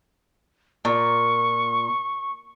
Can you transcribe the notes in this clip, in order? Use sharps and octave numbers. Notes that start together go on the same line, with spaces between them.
A#2 C#6